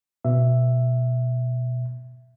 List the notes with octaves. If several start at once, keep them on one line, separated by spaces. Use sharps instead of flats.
B2 E5